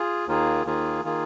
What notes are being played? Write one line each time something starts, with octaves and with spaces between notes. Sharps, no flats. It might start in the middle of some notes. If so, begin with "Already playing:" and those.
Already playing: F4 G#4
D#2 D#3 A#3 F4 G#4
D#2 D#3 A#3 F4 G#4
D#3 A#3 F4 G#4